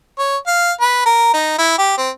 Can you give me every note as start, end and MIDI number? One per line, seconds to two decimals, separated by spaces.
0.19 0.37 73
0.47 0.72 77
0.81 1.03 71
1.06 1.30 70
1.34 1.54 63
1.58 1.75 64
1.78 1.96 67
1.98 2.10 60